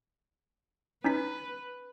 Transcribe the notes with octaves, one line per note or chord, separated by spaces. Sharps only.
C#4 D#4 B4 B6